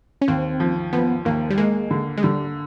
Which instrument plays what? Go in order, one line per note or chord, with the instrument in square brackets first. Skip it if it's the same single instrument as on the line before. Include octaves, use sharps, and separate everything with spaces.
[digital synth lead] C#4
[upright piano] D#2 [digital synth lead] C4
[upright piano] F3
[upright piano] F3 [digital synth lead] B3
[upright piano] D#2 [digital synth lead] A#3
[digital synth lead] G3
[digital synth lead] G#3 [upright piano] A#3
[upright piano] D3
[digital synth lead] G#3
[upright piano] D3 [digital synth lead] G3